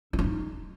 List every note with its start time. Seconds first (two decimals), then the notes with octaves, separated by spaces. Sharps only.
0.13 E4
0.19 F4
0.24 D#4